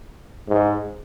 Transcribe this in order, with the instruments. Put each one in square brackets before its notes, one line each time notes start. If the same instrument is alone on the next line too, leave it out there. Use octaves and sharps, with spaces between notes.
[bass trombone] G#2